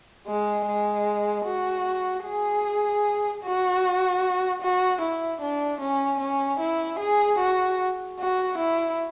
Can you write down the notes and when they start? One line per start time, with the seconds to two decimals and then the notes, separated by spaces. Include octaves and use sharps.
0.27 G#3
0.66 G#3
1.45 F#4
2.25 G#4
3.44 F#4
4.62 F#4
5.02 E4
5.42 D4
5.81 C#4
6.21 C#4
6.60 E4
7.00 G#4
7.39 F#4
8.19 F#4
8.58 E4